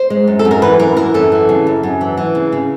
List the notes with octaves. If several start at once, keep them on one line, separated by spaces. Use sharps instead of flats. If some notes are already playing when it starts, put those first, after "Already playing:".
Already playing: C5
G#3
F#2
A4
F#2
A#4
E3 B4
F#2 A#4
E3 A#4
F#2 A4
E3
C#3
F#2
F#2
E3
E3
C#3
C#3